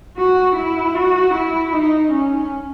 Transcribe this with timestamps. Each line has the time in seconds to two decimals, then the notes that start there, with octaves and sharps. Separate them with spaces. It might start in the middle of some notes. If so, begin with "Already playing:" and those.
0.17 F#4
0.57 E4
0.95 F#4
1.35 E4
1.73 D#4
2.13 C#4